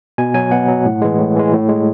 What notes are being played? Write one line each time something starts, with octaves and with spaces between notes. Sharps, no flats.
B2 G#5
F#3 G#5
B2 F#5
F#3
A2
E3 G#3
A2
E3 G#3
A2
G#3